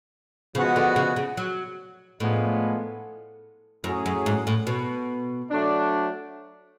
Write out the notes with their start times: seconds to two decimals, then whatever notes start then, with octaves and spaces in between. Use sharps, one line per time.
0.55 C#3 F3 G#3 B3 F#4
0.76 D3
0.96 C#3
1.16 C#3
1.37 F#3
2.20 A2 F3 G#3 B3 D4 F4
3.84 F#2 A2 F#3 C#4 G#4
4.06 F#2
4.26 G#2
4.47 A2
4.67 B2
5.50 F#3 A3 D4